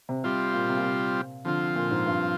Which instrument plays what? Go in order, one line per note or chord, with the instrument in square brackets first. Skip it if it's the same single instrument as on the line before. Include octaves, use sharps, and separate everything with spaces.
[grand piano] C3
[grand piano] C3 [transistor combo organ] G3 C4 F4
[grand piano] A#2
C3
A#2
C3
[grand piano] D3 [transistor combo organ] F3 C4 F4
[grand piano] A#2
G#2
G2